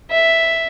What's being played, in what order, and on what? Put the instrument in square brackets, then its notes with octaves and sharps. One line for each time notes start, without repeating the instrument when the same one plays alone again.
[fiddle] E5